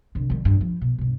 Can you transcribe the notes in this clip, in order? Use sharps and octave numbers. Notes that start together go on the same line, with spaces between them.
C2 D3
D#3 G3
G2 D#3
F3
B2
G2 B2